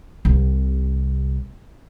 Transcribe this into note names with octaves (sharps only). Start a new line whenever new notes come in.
C2 C3